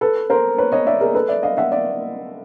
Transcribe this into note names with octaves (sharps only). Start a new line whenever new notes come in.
A4 B4
A#4 C5
B4 C#5
C#5 D#5
D5 E5
G#4 A#4
A4 B4
D5 E5
D#5 F5
E5 F#5
D5 E5